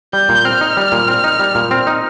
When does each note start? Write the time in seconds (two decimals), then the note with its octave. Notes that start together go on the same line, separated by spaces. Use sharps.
0.13 G3 G6
0.29 A#2
0.45 C4 F6
0.61 D#4
0.77 G3
0.92 A#2
1.08 C4
1.24 D#4
1.40 G3
1.55 A#2
1.71 C4
1.87 D#4